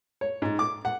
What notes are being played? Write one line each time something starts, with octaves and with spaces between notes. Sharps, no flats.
C#5
G#2
D6
F#5